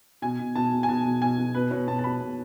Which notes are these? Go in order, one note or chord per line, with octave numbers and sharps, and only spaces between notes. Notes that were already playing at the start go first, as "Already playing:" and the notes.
B2 G#5
B2
B2 A5
B2
G#5
B2 A5
B2
B2 G#5
B2
B2 B4
B2 C#5
B2 A5
A5
B2 B5
B2